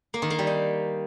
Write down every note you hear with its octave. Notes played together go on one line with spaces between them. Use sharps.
A#3
D#3
A#3
G3
D#4